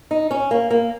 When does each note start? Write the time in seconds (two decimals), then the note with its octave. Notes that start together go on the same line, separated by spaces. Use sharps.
0.11 D#4
0.31 C#4
0.51 A#3
0.70 A#3